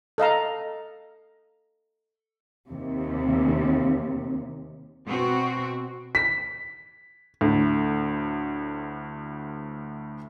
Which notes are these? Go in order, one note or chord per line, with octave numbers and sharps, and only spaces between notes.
A4 D#5 F5 A#5
D#2 C3
B2 C4 F#4
B6
D2 A2